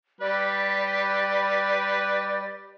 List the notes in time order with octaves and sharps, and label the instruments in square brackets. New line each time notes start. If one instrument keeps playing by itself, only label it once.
[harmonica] G3 B4 [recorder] D5